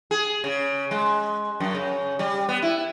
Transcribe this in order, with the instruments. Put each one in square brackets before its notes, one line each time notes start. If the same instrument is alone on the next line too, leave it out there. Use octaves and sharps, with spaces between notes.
[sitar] G#4
C#3
G#3
F#2
C#3
G3
B3
E4